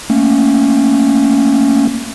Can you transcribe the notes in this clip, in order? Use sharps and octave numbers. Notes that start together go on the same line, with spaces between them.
A3 A#3 C#4